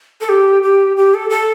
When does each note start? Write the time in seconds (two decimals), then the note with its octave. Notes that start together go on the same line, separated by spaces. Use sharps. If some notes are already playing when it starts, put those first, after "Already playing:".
0.21 A4
0.29 G4
0.63 G4
0.97 G4
1.14 A4
1.30 A4